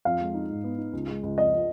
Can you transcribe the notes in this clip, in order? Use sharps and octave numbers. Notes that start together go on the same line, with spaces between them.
F2 F5
G#3
D#4
G#2
B3
D#4
C#2
G#3
C#2
F2 D#5
F3